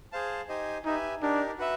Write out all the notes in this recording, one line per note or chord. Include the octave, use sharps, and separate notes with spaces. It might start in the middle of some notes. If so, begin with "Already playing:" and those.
G#4 C5 F5 A5
D#4 G4 C5 D#5 G#5
D#4 G4 B4 E5 G#5
D4 D#4 G4 A#4
F#4 B4 E5